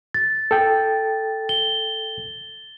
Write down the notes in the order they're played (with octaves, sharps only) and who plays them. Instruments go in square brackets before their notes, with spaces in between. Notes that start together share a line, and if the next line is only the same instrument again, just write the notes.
[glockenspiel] A6
[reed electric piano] A4 G5
[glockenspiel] G7